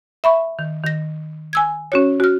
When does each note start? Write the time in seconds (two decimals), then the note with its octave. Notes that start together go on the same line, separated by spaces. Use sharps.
0.24 E5 B5 C#6
0.59 D#3
0.84 D#3 A#6
1.53 G#5 E6 G#6
1.92 C#4 F#4 C#5
2.20 F#4 F6